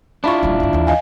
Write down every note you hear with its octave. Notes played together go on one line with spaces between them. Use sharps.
D4 E4 F4 B5 C#6
D#1 G3
G2 D3
D#2 E3
D#5 F5 G#5